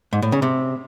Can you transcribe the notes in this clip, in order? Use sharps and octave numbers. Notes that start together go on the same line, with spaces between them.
G#2
A2
C#3
C3